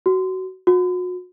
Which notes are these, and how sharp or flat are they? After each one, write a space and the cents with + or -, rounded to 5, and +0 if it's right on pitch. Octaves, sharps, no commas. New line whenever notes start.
F#4 +20
F#4 -35